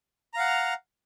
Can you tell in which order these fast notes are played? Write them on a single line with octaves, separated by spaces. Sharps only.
A#5 F5 F#5